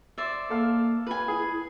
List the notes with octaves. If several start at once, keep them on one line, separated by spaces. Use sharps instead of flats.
C5 D5 E5
A#3 A4 F5
F4 B4 G#5
E4 G#4